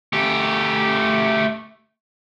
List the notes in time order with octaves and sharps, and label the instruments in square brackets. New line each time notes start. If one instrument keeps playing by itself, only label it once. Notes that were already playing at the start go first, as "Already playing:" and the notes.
[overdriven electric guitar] A3 G4